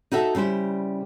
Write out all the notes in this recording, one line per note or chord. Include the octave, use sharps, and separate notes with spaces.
D#4 F#4 A4 E5
C#3 G3 E4 C5